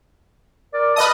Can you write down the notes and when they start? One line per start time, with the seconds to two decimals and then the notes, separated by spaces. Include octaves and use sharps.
0.73 A#4 D5
0.96 B4 D#5 A5 D#6 F6